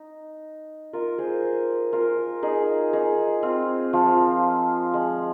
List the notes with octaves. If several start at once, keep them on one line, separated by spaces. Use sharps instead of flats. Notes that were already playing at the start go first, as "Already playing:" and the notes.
Already playing: D#4
F4 A#4
G#4 C5
F4 A#4
D#4 G#4
D#4 G#4
C4 F4
F3
G#3